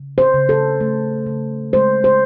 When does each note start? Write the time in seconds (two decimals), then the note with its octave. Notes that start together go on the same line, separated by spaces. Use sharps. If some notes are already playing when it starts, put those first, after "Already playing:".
Already playing: C#3
0.18 C5
0.34 C#3
0.49 A4
0.81 A3
1.27 C#3
1.73 G#3 C5
2.04 C5